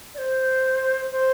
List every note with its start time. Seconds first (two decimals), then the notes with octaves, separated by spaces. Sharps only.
0.14 D5
0.18 C5
1.11 C5